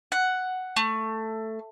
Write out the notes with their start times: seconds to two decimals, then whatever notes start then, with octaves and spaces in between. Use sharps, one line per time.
0.12 F#5
0.76 A3